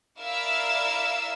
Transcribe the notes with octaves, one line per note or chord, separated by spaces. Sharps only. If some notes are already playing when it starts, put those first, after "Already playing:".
E4 A#4 D5 E5 F5 E6